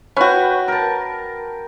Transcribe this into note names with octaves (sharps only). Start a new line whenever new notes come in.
C#4 F#4 B4 G5
A#4 A5